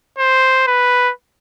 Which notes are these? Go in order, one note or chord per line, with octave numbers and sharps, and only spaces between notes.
C5
B4